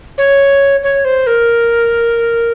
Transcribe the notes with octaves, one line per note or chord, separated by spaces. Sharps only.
C#5
C#5
C5
A#4